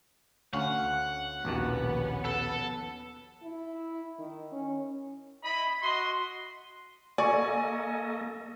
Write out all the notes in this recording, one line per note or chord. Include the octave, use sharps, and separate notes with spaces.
D2 C#4 F5 F#5
A#1 D#2 B2 B3 C#4
A4
E4
D#3
C#4
E4 D#5 B5
F#4 D#5 C6
A#3 A4 D5 D#5 G#5 C#6